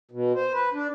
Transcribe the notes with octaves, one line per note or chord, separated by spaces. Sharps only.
B2
C5
B4
D4